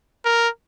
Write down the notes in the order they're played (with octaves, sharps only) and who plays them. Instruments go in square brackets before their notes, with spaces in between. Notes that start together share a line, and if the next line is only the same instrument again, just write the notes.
[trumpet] A#4